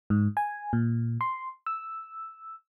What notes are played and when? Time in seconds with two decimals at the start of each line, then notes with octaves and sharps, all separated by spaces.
0.10 G#2
0.37 G#5
0.73 A#2
1.21 C6
1.67 E6